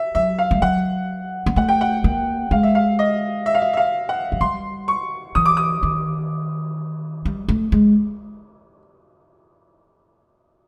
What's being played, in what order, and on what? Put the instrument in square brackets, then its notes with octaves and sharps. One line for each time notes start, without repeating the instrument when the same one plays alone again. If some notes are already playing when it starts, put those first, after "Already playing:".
Already playing: [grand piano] E5
[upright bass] F#3 [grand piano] E5
[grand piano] F5
[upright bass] G3
[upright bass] F#3 [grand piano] F#5
[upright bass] A#3
[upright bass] A3 [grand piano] F#5
[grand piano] G5
F#5
[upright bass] A#3
[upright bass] G#3 [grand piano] F5
[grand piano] E5
F5
D#5
E5
F5
E5
E5
F5
F#5
[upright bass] F#3
[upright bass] G3 [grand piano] C6
[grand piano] C#6
[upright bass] E3 [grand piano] D#6
[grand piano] D6
D#6
[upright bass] D#3
G3
A3
G#3